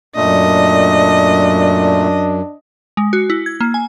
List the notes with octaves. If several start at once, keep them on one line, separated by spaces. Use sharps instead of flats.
F#2 A#2 A3 D4 D#5
G#3
F#4
E4
G#6
A#3
G#5